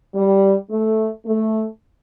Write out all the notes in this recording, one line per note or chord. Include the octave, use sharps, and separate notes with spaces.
G3
A3
A3